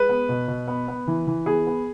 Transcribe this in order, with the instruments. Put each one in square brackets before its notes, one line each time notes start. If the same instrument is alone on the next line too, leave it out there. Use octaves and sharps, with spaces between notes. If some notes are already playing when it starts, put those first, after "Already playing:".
Already playing: [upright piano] G#3 B4
B3
B2
B2
B3
B3
E3
E3
B3 G#4
B3